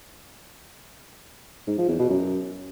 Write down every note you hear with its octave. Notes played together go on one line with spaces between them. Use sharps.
G#2
F3
E2
B2
F#2